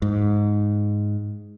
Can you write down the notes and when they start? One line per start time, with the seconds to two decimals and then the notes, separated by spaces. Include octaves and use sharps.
0.02 G#2